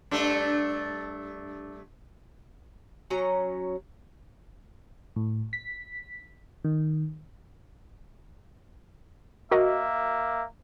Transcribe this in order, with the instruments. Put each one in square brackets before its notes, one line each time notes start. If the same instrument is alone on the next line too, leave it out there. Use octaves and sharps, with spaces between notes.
[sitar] G2 A3 D4
[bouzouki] F#3 C#4 A#5
[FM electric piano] A2
B6
D#3
[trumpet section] A#3 E5 [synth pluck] F#4 A#4 D#5